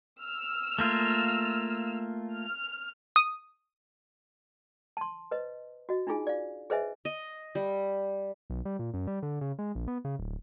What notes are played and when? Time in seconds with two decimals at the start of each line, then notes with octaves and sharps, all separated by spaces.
0.22 E6 F6
0.78 A3 A#3 F4
2.36 F6
3.16 D#6
4.97 A5 C6
5.31 B4 C5 D#5
5.89 F#4 D#5
6.07 D4 D#4 F4 G#4 G#5
6.27 D5 F5
6.70 G#4 B4 C5 D#5 E5 G#5
7.05 D#5
7.55 G3
8.50 B1
8.65 G3
8.79 A#2
8.94 F#2
9.07 G3
9.23 D3
9.41 C#3
9.59 G#3
9.75 A#1
9.88 B3
10.05 C#3
10.19 D1